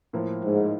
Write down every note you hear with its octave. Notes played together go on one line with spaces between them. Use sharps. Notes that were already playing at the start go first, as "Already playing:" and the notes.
A2 F3 A#3
G#2